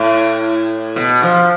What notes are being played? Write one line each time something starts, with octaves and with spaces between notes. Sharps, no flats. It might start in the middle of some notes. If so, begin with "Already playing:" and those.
Already playing: A2
B2
F3